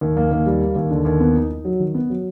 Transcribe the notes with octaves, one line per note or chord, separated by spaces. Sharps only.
D#2
A#3
D#2
G3
A#3
D#2
D3
D#2
B3
D#4
D#4
F#3
D#3
B3
F#3